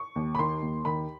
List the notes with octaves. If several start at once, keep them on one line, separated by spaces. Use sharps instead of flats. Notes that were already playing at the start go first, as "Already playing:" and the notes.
Already playing: C#6
D#2
B5
D#3 C6
D#2
D#3 B5